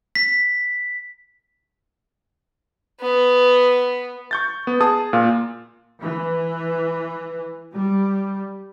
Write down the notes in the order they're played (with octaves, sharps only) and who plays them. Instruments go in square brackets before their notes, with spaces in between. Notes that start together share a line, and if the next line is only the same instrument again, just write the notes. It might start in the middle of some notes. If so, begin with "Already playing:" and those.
[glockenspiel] B6
[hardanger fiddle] B3
[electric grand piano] C#6 G6 A6
B3
G#4 A5 D#6
A#2 F4 F5
[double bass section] E3
G3